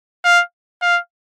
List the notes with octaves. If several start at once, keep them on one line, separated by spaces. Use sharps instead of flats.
F5
F5